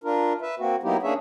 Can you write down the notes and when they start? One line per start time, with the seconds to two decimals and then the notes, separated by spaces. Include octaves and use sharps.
0.04 D4 F4 A#4
0.42 B4 E5
0.59 A#3 C4 F#4
0.83 F#3 A#3 B3 D#4 E4 G4
1.03 A#3 C#4 D4 G#4 C#5 E5